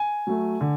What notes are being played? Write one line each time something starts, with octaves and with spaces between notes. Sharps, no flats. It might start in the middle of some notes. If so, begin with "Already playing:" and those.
Already playing: G#5
F#3 A3
D3